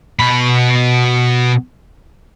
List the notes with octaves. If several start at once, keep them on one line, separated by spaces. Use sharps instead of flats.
B2 B5